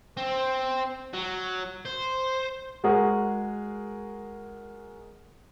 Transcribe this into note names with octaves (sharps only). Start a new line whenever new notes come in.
C4
F#3
C5
G#3 F#4 G#4 A#4